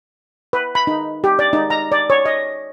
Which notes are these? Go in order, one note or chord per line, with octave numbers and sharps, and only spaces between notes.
B4
B5
D#4
G4
D5
D#4
A#5
D5
C#5
D#5